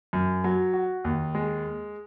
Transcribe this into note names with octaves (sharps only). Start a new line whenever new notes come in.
F#2
F#3
F#4
D#2
G#3